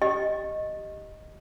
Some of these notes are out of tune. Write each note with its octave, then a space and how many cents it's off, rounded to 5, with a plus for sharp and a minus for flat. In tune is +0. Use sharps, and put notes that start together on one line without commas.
G4 -10 D#5 +0